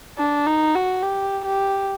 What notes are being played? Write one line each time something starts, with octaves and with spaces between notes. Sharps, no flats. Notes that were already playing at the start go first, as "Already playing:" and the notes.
D4
D#4
F#4
G4
G4